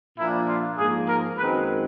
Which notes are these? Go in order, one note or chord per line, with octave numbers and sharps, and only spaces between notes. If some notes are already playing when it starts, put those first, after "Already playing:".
A#2 F3 A#3 D4 E4
F4
G#2 F3 A#3 G#4
A#4
F#2 D#3 G#3 C4 B4